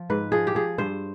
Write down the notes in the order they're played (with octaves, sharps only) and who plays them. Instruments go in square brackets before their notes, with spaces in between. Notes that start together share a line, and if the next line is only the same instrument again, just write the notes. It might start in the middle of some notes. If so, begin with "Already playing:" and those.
Already playing: [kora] F3
G#2 B4
F3 G#4
G4
F3 G#4
G2 C5